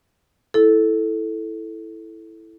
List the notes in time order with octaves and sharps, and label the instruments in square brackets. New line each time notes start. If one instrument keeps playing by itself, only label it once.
[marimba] E4 A4